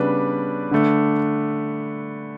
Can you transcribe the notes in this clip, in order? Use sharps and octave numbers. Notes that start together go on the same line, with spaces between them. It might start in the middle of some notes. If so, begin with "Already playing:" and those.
Already playing: C#3 G3 B3 D4 B4
D3 A3 D4